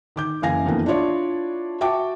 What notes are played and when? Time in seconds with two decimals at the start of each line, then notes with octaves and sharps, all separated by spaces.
0.16 D#3 D6 G6
0.42 F#1 E3 F5 G#5 A#6
0.66 F2 D#3 E3 A#3 B3
0.86 D4 E4 F4 C#5 D5
1.81 F#4 E5 G5 A5 D6